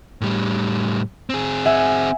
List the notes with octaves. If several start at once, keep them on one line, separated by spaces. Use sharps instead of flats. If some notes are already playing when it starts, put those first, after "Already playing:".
A2 G3
C4 G#4
E5 F#5 G#5